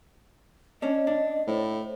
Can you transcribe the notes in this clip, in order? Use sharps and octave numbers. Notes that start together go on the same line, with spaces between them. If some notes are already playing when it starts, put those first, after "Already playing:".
C#4 D4 D#5
D4
A2 C5